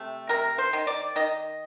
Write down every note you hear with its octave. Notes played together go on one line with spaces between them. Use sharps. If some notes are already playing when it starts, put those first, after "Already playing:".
Already playing: C3 A3
C3 A#4
C5
D#3
D5
D#3 D#5